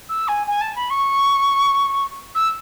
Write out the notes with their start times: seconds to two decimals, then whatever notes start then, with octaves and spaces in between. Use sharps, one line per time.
0.09 E6
0.28 G#5
0.47 G#5
0.61 A5
0.75 B5
0.90 C#6
2.35 E6